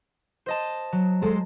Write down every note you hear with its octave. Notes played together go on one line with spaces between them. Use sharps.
C5 D#5 A5
F#3
G#3 A4 C5